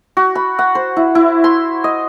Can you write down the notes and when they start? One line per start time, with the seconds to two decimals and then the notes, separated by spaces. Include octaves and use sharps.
0.17 F#4
0.35 B5
0.59 F#5
0.75 C5
0.97 E4
1.15 E4
1.44 C6
1.84 D#5